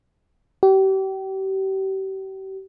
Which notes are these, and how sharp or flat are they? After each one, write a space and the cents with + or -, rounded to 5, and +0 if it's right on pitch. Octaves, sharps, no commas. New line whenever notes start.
G4 -35